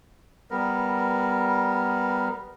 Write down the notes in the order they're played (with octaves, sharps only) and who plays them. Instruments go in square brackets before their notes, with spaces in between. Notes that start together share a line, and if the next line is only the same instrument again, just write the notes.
[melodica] G3 B3 A#4